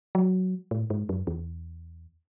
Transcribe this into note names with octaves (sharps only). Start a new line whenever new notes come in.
F#3
A2
G#2
F#2
E2